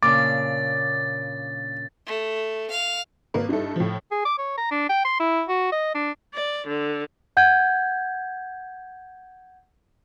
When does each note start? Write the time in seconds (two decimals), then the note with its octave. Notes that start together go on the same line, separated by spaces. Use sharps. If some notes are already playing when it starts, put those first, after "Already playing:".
0.03 A#2 C#3 D4 D6 A6
2.07 A3
2.70 F5
3.34 G#1 A#3 B4
3.49 G2 D#4 E4 A4
3.76 A2 F3
4.11 G#4
4.25 D6
4.38 C#5
4.57 A#5
4.71 D4
4.89 G5
5.05 C6
5.20 E4
5.49 F#4
5.72 D#5
5.95 D4
6.35 D5
6.67 D3
7.37 F#5 G6 G#6